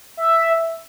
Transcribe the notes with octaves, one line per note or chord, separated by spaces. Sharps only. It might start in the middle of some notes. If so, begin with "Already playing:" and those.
E5